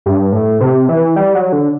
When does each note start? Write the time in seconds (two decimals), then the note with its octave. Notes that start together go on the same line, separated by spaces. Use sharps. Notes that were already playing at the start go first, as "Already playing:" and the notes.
0.06 G2
0.33 A2
0.61 C3
0.89 E3
1.16 G3
1.35 F#3
1.53 D3